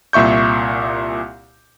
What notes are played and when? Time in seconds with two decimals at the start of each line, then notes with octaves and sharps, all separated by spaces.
0.13 C2 A#2 E5 C#6 G6